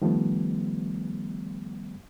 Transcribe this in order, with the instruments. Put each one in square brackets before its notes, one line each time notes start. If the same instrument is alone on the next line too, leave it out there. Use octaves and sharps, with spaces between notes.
[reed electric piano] D#3 F3 G3 A3 B3